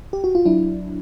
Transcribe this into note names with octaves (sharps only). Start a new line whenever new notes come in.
G4
F#4
F4
F#3 D4 E4